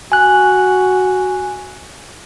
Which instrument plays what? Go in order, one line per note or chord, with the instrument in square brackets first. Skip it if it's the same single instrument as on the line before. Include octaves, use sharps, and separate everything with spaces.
[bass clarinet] F#4 [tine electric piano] G#5 F#6